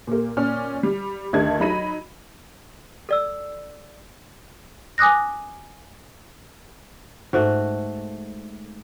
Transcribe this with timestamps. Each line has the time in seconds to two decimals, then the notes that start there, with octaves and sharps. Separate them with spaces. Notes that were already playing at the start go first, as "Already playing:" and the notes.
0.07 A#2 A#3
0.37 A#2 C#4 D5 F6
0.83 G3
1.33 D2 D#3 D4 D#4 A4 G#6
1.60 F#3 D#4 B5 A#6 D#7
3.09 A4 D5 E6
4.98 G#5 D6 D#6 F#6 A#6
7.33 G#2 A3 F#4